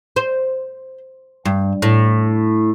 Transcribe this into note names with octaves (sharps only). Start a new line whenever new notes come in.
C5
G2
A2